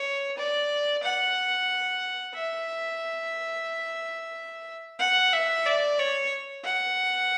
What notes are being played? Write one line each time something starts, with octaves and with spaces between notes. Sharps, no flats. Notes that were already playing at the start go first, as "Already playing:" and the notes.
Already playing: C#5
D5
F#5
E5
F#5
E5
D5
C#5
F#5